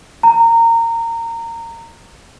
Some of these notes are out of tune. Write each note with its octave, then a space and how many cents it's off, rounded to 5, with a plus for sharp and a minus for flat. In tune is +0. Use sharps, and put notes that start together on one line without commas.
A#5 -20